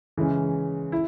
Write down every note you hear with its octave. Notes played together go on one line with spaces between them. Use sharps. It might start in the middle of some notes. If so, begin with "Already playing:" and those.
C#3 E3 G#3 C#4
E4